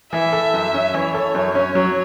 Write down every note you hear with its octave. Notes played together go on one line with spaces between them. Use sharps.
E3 E5
A4
F#2
C#4
E3 C#5
A4
F#2
C#4
F#3